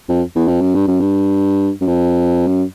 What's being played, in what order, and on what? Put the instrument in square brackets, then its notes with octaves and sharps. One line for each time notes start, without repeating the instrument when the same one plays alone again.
[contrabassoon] F2
E2
F2
F#2
G2
F#2
G2
F#2
F2
F#2